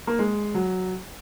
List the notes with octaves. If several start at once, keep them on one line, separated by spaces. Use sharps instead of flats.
A#3
G#3
F#3